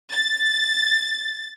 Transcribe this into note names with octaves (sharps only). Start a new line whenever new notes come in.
A6